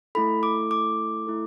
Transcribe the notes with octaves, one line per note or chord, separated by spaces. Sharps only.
A3 E4 A4 B5
D6
D6
A3 E4 A4